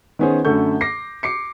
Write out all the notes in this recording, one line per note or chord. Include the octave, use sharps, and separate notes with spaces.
D#3 B3 C#4 G#4 C5
F#2 D3 A3 A4 C#6 G6
D6 A#6 C7
D6 C7 C#7